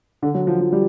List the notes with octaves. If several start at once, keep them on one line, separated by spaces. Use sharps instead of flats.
D3
F#3
F3
F3
G3